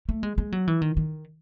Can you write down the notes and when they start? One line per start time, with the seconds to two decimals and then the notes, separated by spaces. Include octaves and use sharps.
0.09 A3
0.23 G#3
0.38 G#3
0.52 F#3
0.67 E3
0.82 D#3
0.97 D#3